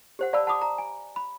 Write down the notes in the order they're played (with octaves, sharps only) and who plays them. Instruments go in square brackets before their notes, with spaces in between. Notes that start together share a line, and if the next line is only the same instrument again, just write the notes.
[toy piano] G4 C5 F#5
[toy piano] D5 A5 B5 [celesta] F5 E6
[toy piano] F#5 B5 D6 [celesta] A5 D#6
[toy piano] A#5
[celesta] G#5
B5